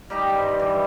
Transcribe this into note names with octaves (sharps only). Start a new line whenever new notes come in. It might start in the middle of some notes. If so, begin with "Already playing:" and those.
G3 D#4 G4 D#5
G2 C5
E3